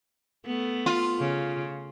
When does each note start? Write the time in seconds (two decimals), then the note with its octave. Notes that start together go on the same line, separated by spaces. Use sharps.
0.46 A3 B3
0.86 F4
1.19 C#3